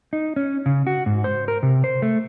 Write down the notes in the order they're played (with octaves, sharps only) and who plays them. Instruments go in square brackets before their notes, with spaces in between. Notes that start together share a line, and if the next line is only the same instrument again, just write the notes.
[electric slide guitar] D#4
C#4
C#3
F#4
G#2
C5
A#4
C3
C5
A3